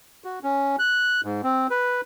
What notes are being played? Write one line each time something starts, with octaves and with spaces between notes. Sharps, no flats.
F#4
C#4
F#6
G#2
C4
B4